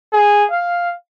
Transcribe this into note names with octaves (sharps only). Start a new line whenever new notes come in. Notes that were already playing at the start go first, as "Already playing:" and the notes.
G#4
F5